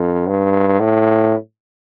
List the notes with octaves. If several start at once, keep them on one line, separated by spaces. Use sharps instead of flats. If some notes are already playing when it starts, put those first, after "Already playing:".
Already playing: F2
G2
A2